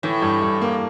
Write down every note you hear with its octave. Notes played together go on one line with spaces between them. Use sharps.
A2 E3
G2
G2
A#3